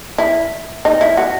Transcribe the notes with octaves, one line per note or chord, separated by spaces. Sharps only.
E4
D#4
E4
F#4